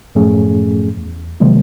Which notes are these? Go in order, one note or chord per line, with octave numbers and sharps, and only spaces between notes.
F#2 A2 F3 A3 C#4 G#4
E2
C3 D#3 F3 F#3 G#3 A#3